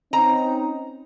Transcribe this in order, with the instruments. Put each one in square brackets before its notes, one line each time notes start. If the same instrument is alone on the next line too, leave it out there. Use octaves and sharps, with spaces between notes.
[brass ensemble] C4 C#4 D#4 [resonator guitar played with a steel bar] A#5